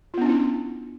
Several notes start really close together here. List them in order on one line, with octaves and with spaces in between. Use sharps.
F4 B3 D4 C#4 E4